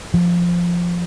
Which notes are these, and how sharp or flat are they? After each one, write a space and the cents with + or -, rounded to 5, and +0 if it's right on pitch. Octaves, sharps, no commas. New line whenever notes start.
F3 +0